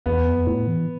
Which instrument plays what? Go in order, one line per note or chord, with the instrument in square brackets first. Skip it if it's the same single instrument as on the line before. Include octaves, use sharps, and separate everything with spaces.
[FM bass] E2 [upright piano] B3
[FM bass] F2
A2
E3